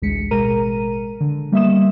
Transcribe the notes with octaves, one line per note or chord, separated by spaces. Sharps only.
A1 D2 G#3 B6 C#7
A1 B2 G#3 A#4 A#5 D#7
D3
G3 A#3 B3 E5 D#6 E7